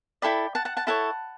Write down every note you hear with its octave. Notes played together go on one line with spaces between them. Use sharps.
E4 A4 D5 G5 B5
F#5 A5
F#5 A5
F#5 A5
E4 A4 C#5 F#5 A5